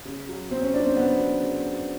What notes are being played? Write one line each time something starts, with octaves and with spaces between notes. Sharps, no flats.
C#3
F#3
C#3 C4
C#4
F#3 D4
C4
C#3 B3
F#3
C#3
F#3